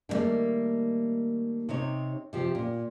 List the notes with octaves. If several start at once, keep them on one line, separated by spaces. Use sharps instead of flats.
D3 D#3 G3 A3 A#3
C3 D#4 C#5
C3 F3 G4
A#2